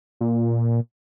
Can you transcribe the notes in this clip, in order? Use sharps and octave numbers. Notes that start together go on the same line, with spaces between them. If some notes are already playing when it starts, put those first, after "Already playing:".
A#2